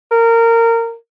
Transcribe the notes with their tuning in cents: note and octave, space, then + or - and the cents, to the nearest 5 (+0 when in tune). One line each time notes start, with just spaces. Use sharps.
A#4 -20